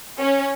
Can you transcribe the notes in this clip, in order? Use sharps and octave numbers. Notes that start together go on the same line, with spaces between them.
C#4